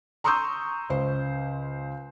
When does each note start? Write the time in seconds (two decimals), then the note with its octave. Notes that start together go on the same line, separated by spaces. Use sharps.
0.24 A#5 C6 C#6 D#6 E6 G6
0.90 C#2 C5